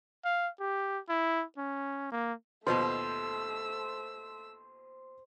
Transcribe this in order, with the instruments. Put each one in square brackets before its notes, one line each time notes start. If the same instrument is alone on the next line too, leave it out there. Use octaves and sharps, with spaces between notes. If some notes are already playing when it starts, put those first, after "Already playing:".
[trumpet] F5
G4
E4
C#4
A#3
[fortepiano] D#2 B2 F3 [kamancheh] A3 E6 [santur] C5